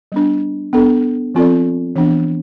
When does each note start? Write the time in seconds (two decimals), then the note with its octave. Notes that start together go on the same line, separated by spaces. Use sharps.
0.12 G3 B3 D4
0.73 B3 D4 A4
1.35 F3 C4 F4 A4 D5
1.96 E3 B3 D4